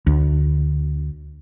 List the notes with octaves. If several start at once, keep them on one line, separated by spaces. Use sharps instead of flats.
D2